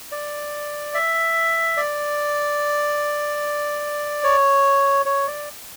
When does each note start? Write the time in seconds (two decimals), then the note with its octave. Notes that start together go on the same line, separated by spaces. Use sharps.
0.12 D5
0.94 E5
1.77 D5
4.24 C#5
5.06 C#5
5.27 D5